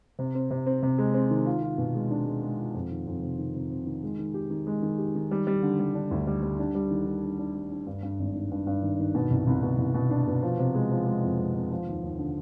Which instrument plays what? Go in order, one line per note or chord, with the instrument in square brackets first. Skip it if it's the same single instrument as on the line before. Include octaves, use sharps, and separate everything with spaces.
[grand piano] C3
C4
C3
C4
C3
G#3
C4
D#3
F4
F4
B2
G#3
D4
G#3
G#3
F4
F2
D#3
F2
C3
D#3
C3
C3
D#3
G#3
D#3
G4
D#3
G#3
D#3
G4
D#3
G3
G3
D3
G3
D4
D2
G3
G3
D4
G3
D#3
D#3
D4
D4
G3
D4
G2
G2
G#1
D#3
G2
G2
D#3
D#3
B2
C2
C2
B2
C2
B2
D4
B2
F3
C3
G#3
F3
G#3
F2
G#3
C3
F3
D#2
D#2
D3